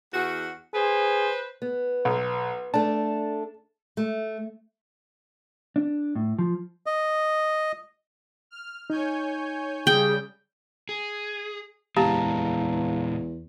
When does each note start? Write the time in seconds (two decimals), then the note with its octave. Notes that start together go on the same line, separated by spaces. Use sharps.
0.14 E2 F#4
0.74 G#4 B4 C5
1.62 B3
2.05 B1
2.74 A3 D4 A5
3.97 A3
5.76 D4
6.15 A2
6.39 F3
6.86 D#5
8.51 F6
8.90 D#4 C#5 G#5 G6
9.87 C#3 G3 G#4 G5
10.89 G#4
11.97 E2 A#2 G#3 G4 F5 A5 A#5